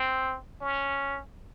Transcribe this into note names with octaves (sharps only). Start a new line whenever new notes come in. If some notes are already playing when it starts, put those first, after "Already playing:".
Already playing: C4
C#4